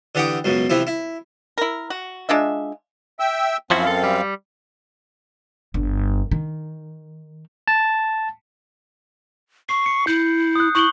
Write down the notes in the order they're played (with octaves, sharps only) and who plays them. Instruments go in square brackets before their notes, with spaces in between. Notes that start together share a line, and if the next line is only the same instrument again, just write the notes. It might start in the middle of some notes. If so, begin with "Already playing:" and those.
[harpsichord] D3 E3 G4 F#5 G5 D#6
C#2 F#2 B2
C3 E3 F3 E4
E4
[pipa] E4 A#4
F#4
G#3 D4 F4 E5
[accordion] E5 G5 E6
[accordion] F#2 C4 F5 [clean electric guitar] F3 E4 F#4
[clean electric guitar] A4
G3
[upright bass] G1
D#3
[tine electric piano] A5
[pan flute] C#6 [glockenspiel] C7
[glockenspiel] C#7
[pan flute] E4 [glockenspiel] G6
[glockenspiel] D#6 F#6
[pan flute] E4 [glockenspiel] C#6 F#7 G7